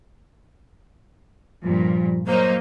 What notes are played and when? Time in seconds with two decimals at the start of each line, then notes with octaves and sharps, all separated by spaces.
1.64 G2 A#2 F3
2.27 F#3 A#3 D#4 C5